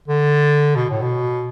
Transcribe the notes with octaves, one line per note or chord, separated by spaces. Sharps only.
D3
B2
A2
B2